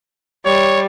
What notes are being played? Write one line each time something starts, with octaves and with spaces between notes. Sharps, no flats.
G3 C#5